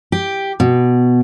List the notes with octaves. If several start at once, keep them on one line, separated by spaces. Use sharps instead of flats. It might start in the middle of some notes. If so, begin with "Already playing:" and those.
G4
B2